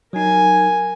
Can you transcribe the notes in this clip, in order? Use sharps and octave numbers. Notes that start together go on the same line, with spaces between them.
F#3 D#4 A#4 G#5